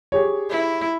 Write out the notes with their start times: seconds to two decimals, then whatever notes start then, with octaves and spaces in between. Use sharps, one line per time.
0.12 G4 G#4 C#5
0.50 E4